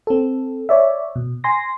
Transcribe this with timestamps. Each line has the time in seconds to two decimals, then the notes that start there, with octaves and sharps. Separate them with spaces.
0.07 C4 A4
0.69 C#5 D5 E5
1.16 B2
1.44 G#5 C6 A#6